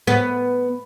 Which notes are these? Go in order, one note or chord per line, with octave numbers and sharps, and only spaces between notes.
B3